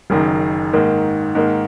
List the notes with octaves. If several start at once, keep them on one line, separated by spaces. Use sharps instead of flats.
F#1 F#2 D#3
G#2 D#3 A#3
G#2 D#3 A#3